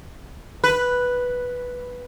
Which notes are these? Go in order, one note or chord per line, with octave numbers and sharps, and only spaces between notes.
B4